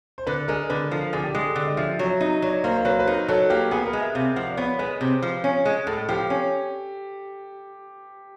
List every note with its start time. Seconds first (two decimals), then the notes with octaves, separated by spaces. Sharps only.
0.18 C5
0.27 D3 B4
0.48 G#3 A#4
0.70 D3 B4
0.91 F3 A4
1.13 D3 G#4
1.24 G4
1.34 G#3 G#4
1.45 A4
1.55 D3 D5
1.67 D#5
1.77 F3 E5
1.99 F#3 E5
2.20 D#4 D#5
2.42 F#3 D5
2.53 C#5
2.64 A#3 C5
2.74 C5
2.85 F#3 B4
2.92 C5
2.99 B4
3.07 D#4 A#4
3.28 F#3 A4
3.50 A#3 G4
3.71 B3 G#4
3.86 A#4
3.93 G#3
4.00 E5
4.15 C3 F5
4.36 F3 F#5
4.51 D5
4.57 B3 C#5
4.79 G#3 B4
5.01 C3 C5
5.22 F3
5.44 C#4
5.65 G#3
5.87 A2 A4
6.09 F3 G4
6.30 C#4